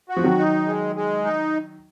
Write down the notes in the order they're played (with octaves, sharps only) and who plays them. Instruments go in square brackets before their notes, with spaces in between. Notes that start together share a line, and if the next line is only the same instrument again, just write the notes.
[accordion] F#4
[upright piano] F3
D#3 F#3
[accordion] D#4
G#3
G#3
D#4